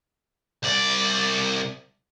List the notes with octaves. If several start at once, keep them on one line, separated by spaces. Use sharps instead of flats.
C2 D5